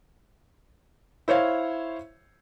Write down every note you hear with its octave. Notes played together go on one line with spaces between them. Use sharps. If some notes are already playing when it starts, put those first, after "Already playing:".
E4 C5 C#5 F5